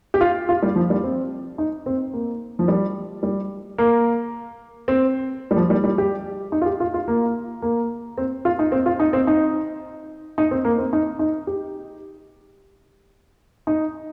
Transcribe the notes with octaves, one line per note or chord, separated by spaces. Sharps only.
G4
F4
F4
G3
F3
G3
C4
D#4
C4
A#3
F3
G3
G3
A#3
C4
G3
F3
G3
G3
G4
D#4
F4
G4
F4
F4
A#3
A#3
C4
F4
D#4
C4
F4
D#4
C4
D#4
D#4
C4
A#3
C4
D#4
D#4
G4
D#4